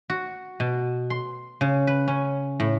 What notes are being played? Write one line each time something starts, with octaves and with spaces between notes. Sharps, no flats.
F#4
B2
C6
C#3
B4
C#4
A2